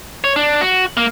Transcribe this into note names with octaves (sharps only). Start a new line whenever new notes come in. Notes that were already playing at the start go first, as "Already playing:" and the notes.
C#5
D4
F#4
A#3